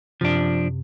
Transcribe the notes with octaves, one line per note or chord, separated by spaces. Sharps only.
F#2 C3 F3 D4